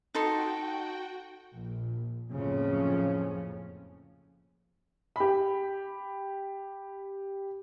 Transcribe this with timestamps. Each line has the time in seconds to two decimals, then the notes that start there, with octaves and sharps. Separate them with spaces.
0.14 D#4 F#4 A4 G5 C6
1.52 A#1
2.30 F#1 F2 A2 C#3 F3 C#4
5.16 G4 B5